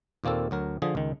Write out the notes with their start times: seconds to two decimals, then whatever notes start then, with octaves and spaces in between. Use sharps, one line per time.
0.24 D#2 A#2 A#3 C4 A4
0.51 D2 F#3 A#4
0.82 D3 F3 G#4
0.95 C#2 D#3